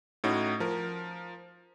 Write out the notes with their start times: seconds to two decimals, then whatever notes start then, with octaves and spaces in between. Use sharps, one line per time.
0.24 A2 C#4 D#4 F#4
0.60 F3 A#4